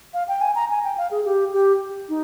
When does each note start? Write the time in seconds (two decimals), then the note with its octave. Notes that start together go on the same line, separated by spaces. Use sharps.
0.14 F5
0.28 G5
0.41 G#5
0.55 A#5
0.70 G#5
0.84 G5
0.98 F5
1.11 G#4
1.25 G4
1.53 G4
2.09 D#4